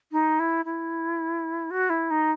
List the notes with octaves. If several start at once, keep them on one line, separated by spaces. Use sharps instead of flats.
D#4
E4
E4
F#4
E4
D#4